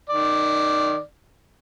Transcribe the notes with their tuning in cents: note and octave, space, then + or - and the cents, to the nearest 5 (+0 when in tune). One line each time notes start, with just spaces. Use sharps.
D#3 -15 D5 +0